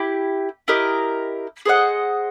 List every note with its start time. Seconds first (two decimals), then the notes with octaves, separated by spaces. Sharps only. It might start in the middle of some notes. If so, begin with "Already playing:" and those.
Already playing: E4 G4
0.68 E4 G4 A#4 D#5
1.66 G#4 C5 D#5 F#5